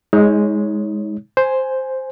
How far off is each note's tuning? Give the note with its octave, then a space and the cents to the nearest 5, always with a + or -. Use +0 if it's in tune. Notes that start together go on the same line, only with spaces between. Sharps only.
G#3 +0 D#4 +35 C#5 +0
C5 +0 G#5 +0